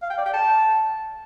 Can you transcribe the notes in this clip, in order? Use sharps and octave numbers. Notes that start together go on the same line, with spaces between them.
F5
G5
D5
G5
A5